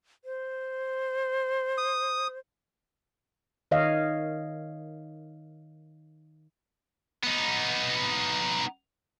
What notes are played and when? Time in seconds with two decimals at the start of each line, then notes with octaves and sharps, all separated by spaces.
0.25 C5
1.78 D#6
3.71 D#3 C#5 D#5 F5
7.23 B3 D#4